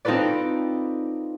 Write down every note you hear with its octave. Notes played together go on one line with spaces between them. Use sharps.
C4 D#4 F4 A4 B4 D5